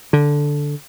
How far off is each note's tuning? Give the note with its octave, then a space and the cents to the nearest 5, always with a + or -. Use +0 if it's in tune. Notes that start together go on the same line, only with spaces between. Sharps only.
D3 -5